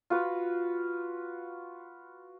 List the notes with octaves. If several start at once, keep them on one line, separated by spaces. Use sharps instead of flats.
F4 F#4 B4